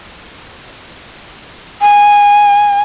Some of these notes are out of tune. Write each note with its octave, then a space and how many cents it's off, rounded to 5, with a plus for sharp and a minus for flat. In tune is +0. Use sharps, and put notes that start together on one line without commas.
G#5 -10